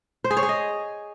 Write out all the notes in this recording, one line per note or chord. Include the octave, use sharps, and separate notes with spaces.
C5
G#4
C#5
G#4
D#5